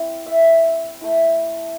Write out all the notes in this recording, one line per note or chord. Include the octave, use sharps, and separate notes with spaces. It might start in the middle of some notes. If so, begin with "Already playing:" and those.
Already playing: C4 E4
E5
A3 E4